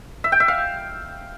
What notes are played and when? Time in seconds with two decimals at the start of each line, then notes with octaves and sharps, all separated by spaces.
0.24 E5
0.32 G5
0.40 E5
0.48 F5